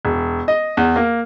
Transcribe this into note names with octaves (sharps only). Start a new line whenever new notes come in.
E1
D#5
E2
A#3